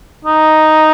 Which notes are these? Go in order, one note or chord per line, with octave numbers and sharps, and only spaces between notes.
D#4